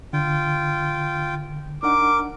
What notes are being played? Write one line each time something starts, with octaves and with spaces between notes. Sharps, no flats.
D3 F4 G5
D4 D#4 A#4 F#5 D6